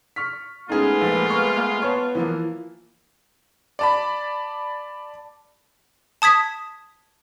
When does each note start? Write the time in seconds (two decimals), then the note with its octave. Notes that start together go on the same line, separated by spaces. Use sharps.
0.16 C#6 F6 B6
0.69 G#3 A3 B3 C#4 D#4 F4 G#4
1.01 A#1 A#3 A6
1.30 C#6
1.82 B3 C#5 A5
2.15 E3 F3 A#3 F4
3.79 D5 A5 B5
6.22 A5 D#6 G#6 B6